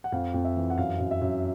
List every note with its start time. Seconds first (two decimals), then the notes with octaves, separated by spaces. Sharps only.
0.04 F#5
0.12 F2 F5
0.34 F2
0.45 E5
0.56 E3
0.70 F#5
0.77 F#2 F5
0.99 F#2
1.11 E5
1.21 F#2